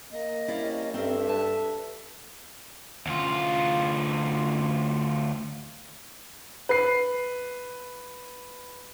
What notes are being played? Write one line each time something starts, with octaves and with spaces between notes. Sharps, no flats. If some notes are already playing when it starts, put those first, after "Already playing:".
A#3 D#5
C3 C#4 E4 D5 F5
G2 C4 A4 A#4 E5
B4 A5
D2 F4
B4 C7